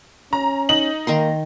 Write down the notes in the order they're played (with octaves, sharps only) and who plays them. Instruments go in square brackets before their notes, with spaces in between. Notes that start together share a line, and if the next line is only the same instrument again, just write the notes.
[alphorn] C#4 [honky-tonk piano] A#5
[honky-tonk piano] D#4 F#7
[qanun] D#3 A#5 C6 [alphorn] A#3